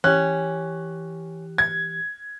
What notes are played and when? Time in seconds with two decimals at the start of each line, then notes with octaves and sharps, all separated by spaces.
0.04 E3 C#4 G4 F#6
1.58 G#6